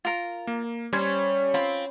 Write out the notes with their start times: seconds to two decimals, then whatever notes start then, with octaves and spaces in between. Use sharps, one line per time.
0.05 F4 A#4
0.47 A#3
0.93 G3 C#4 C5 G#6
1.54 C4 F4 B5